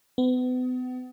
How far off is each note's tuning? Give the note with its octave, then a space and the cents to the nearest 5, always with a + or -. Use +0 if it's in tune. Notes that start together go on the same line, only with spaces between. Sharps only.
B3 +35